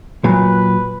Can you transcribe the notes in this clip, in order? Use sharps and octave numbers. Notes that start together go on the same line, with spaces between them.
A#2 F#3 B4